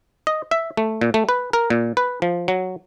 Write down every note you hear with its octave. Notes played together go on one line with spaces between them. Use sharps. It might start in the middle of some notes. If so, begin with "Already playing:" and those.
D#5
E5
A3
A#2
A3
B4
A#4
A#2
B4
F3
F#3